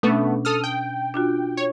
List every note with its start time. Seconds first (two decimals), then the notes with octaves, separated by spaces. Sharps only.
0.03 B2 A3 B3 C#4 D4
0.45 A4 D#6 F6
0.64 G5
1.14 D4 F4 F#4
1.57 C#5